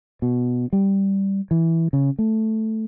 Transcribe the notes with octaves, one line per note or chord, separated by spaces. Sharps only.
B2
G3
E3
C#3
A3